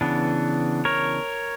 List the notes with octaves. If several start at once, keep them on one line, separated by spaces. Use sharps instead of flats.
C#3 E3 B3 D4
A#4 C#5